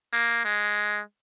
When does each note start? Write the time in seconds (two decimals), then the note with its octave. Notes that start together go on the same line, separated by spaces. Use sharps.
0.13 A#3
0.44 G#3